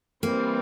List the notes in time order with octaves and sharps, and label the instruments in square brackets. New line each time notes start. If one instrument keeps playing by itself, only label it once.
[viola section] E3 G3 C4 [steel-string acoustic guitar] A#3